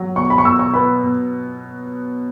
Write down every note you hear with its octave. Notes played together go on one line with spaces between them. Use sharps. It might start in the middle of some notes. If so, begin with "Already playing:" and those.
Already playing: F#3
B2 C#6
B5
C#6
B2 E6
C#6
B3 B5
B2